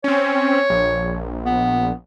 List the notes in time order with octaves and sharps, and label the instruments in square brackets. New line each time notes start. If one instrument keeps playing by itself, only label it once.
[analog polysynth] C4 C#4 [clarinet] C#5
[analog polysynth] A#1
[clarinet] B3